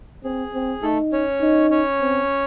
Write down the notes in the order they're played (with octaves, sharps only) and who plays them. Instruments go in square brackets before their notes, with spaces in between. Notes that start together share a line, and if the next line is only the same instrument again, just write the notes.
[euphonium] C4 [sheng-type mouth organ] G#4
[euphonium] C4
[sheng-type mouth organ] A3 A4 [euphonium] D#4
[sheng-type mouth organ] C#4 C#5
[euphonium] D#4
[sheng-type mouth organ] C#4 C#5
[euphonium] C4